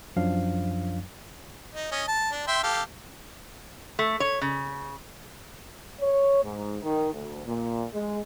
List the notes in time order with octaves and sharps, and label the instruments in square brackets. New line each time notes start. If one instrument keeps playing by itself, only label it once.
[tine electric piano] F#2 F3 F#3 D4 F5
[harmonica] D#4
C#4 D#5
A5
D4
E5 G5 C6
G4 A4 F5
[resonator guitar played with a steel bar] A3
C#5
C#3
[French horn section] C#5
G#2
D#3
D2
A#2
G#3